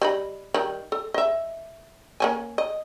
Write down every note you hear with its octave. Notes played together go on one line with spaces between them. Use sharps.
G3 D#4 B5
D#3 G3
A4
D#5 E5
A#3 C#4 G#5
D#5